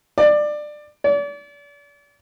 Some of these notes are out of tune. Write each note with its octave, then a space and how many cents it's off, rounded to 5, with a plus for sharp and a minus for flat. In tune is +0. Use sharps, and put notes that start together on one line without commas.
D5 +20
D5 -40